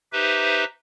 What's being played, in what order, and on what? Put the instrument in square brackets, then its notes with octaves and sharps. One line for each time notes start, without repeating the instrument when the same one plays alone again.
[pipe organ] D#4 G4 B4 C5 E5